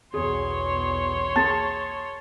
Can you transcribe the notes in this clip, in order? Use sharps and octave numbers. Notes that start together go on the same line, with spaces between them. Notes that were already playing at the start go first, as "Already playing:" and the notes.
B1 E2 G#4 C#5 C6
A#3 G#4 A5